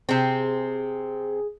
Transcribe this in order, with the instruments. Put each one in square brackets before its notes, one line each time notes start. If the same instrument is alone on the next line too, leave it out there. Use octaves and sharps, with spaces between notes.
[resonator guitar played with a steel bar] C3 C4 [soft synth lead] G#4